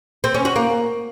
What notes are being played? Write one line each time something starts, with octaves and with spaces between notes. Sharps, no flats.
C4
C#4
F#4
A#3